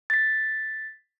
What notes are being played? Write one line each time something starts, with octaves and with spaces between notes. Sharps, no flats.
A6 B6